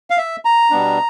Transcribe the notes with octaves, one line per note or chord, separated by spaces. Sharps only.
F5
E5
A#5
B2 G3 B3 D4